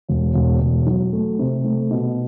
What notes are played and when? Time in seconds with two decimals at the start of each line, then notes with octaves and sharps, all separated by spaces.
0.08 E1
0.34 E1
0.60 E1
0.87 F#3
1.13 A3
1.39 C3
1.64 A3
1.91 B2